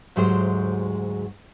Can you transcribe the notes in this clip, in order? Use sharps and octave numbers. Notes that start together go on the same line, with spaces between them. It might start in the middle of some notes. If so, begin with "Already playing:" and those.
D2 G#2 F#3 G#3 G4 C5